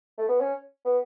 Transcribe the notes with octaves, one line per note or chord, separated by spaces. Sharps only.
A3
B3
C#4
B3